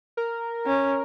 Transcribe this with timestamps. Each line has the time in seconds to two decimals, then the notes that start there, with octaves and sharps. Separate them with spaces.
0.17 A#4
0.67 C#4